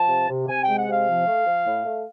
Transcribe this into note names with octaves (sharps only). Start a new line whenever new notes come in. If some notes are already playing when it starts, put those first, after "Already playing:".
Already playing: F3 A5
C3
C3
C3 G#5
G#3 G5
F#5
C3 F5
F3
A3
F3
A2
A3